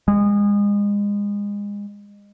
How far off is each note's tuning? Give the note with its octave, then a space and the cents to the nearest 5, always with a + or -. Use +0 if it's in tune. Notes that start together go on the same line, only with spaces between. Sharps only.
G#3 -30